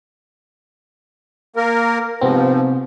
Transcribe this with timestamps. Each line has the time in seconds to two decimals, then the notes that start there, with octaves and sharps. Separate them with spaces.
1.56 A#3 A#4
2.22 G#2 C3 F3 B3 C4